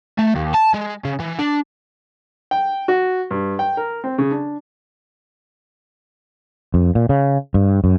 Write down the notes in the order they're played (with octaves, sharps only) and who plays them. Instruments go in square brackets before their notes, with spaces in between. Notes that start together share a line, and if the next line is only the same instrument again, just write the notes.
[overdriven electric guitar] A3
D#2
A5
G#3
C#3
E3
D4
[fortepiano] G5
F#4
G2
G5
A#4
C4
C#3
D4
[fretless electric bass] F2
A#2
C#3
G2
F#2